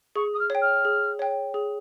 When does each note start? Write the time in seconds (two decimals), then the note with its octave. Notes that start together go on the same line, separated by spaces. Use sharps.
0.16 G#4 C#6
0.34 D#6
0.39 F6
0.50 C#5 G5
0.62 F6
0.85 G#4
1.19 C#5 G5
1.54 G#4